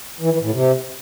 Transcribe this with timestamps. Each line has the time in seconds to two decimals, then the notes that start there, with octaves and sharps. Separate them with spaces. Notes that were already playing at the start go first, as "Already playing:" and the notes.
0.21 E3
0.31 E3
0.42 A2
0.52 C3